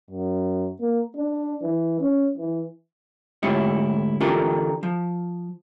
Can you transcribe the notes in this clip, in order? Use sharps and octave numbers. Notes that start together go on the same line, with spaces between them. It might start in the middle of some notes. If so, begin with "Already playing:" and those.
F#2
A#3
D4
E3
C#4
E3
D2 G#2 E4 F4 G4 C#5
D3 E3 D4 F4 G4 A#4
F3